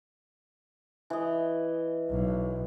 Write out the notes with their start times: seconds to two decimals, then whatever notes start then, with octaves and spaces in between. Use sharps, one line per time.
1.10 E3 D#5
2.09 B1